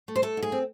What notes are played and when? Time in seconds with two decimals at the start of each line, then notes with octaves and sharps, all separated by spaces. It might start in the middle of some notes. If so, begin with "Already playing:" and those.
0.08 A3
0.16 C5
0.22 A3 A4
0.37 G#2
0.42 G#4
0.52 C4